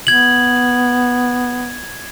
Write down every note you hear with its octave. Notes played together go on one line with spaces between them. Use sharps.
B3 G#6 F#7